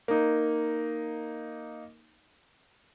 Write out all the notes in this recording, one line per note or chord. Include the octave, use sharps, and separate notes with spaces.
A#3 D#4